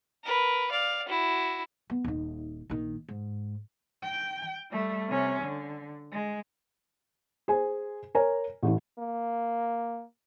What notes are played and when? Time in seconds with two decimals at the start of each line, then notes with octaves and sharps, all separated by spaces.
0.24 A#4 B4
0.71 D5 F5
1.08 E4 F#4
1.90 B3
2.04 D#1 D#4
2.70 A#1 D#3
3.09 G#2
4.03 G5
4.71 G3 A3
5.08 C3 C#4
5.43 D3
6.12 G#3
7.48 G#4 C5 G#5
8.15 A#4 C#5 G#5 A#5
8.63 A1 A2 E3
8.99 A#3